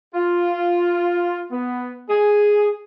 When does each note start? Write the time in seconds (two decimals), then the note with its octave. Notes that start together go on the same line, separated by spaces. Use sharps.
0.14 F4
1.51 B3
2.09 G#4